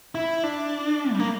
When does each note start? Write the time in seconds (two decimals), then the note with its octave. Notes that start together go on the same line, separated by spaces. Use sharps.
0.15 E4
0.43 D4
1.12 G3
1.19 A#3